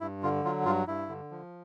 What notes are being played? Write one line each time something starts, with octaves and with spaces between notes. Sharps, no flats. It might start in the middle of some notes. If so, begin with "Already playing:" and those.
G2 E4
D3 F4
F#3 F4
G2 F4
G2 E4
D3
F3